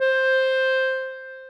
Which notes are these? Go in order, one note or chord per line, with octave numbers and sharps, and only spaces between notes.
C5